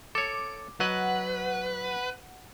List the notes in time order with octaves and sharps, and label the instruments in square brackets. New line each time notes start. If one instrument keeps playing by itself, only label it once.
[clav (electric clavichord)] A4 C#5 [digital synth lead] D6
[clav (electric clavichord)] F#3 D#5 [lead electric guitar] B4 [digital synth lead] F#5